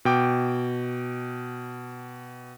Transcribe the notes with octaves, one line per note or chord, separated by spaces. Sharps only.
B2 G5 D6